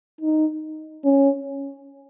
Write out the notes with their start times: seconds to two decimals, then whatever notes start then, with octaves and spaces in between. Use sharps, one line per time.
0.21 D#4
1.05 C#4